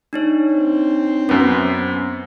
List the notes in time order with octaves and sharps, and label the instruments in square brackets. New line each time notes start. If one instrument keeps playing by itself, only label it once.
[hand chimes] D4 D#4 C#5
[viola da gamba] C4
[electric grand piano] F#2 B3 [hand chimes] C#4